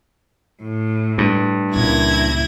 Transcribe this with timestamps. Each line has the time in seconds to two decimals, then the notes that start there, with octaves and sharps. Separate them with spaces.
0.61 A2
1.18 G2
1.74 C#2 A#2 E4 G#6 A#6